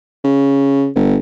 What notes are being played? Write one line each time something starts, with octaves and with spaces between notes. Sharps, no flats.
C#3
G1